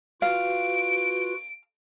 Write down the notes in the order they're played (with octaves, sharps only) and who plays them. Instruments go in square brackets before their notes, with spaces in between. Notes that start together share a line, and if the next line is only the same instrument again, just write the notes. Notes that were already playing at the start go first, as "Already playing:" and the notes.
[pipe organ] F4 F#4 B4 [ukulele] F5 [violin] D7